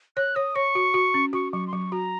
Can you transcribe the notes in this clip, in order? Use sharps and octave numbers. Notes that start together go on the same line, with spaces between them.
C#5 F#6
C#5 D#6
C#5 C#6
F#4
F#4
C#4
F#4 C#6
F#3 C#6
C6
F#3 C#6
F#4 A#5